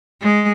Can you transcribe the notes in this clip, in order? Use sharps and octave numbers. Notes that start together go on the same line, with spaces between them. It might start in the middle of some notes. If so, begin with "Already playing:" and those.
G#3